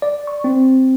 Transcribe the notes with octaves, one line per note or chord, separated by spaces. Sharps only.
D5
C#6
C4